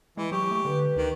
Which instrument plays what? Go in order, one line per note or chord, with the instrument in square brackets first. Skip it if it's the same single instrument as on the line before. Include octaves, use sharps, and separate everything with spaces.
[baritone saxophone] E3 [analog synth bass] G#3
[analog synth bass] F#3 [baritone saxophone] G4 [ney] C#6
[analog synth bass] A3
[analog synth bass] D3 [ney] B4
[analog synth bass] D2 [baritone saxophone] D#3